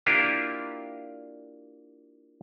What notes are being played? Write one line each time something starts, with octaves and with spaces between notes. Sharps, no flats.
A#3 D4 E4 F4 G4 A#4